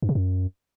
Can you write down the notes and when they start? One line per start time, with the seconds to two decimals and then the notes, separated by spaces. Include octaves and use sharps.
0.02 G2
0.09 C3
0.15 F#2